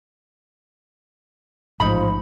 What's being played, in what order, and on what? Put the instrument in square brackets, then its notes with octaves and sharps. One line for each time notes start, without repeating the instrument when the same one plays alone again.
[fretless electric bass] A1 G#2 [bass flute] F3 [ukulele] D#4 B5